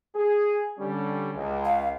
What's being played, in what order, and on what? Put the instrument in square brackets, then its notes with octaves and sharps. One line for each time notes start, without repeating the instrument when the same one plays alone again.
[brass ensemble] G#4
D3 G3 C#4
C#2
[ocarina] F5